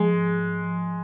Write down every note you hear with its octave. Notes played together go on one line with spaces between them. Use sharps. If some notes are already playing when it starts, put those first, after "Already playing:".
Already playing: F3 G#3
G#2
G#2
F3